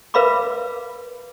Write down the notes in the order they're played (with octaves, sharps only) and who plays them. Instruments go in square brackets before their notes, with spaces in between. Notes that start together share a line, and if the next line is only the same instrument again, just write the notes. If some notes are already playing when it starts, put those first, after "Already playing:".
[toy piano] A#4 B4 E5 F5 B5 D6